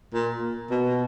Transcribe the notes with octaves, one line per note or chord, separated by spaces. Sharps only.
A#2
B2